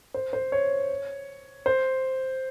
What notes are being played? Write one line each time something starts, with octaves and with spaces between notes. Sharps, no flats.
C5
C5
C#5
C5